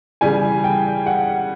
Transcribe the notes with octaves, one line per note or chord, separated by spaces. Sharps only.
C#3 E3 G3 G#5
G5
F#5